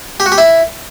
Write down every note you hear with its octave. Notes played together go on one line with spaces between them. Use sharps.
G4
F#4
G4
E4